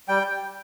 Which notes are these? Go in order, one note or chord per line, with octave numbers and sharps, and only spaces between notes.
G3 G5